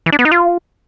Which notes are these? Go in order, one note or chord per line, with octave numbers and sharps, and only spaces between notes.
E3
D4
B3
D#4
F4